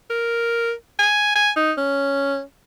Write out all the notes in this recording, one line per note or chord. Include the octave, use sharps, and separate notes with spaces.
A#4
G#5
G#5
D#4
C#4